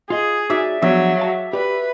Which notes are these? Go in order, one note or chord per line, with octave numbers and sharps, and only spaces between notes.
F4 G#4 D#5
D#4 F#4 D5 E5
F3 F#3 B3 D4 E5
F5 A5
G4 B4 D5